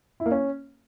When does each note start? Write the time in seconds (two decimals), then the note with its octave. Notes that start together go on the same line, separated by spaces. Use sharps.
0.20 E4
0.26 A#3
0.31 C#4